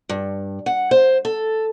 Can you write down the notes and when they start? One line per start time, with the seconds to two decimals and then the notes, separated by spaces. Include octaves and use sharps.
0.09 G2
0.66 F#5
0.91 C5
1.25 A4